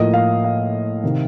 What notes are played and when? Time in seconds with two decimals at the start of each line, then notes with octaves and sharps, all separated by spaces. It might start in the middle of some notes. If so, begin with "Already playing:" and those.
Already playing: A2 F3 A#3 D#5
0.14 F5
0.44 F5
1.04 C3 D#3